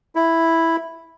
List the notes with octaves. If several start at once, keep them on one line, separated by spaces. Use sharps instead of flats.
E4